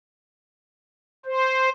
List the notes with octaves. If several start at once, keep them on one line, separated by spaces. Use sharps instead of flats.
C5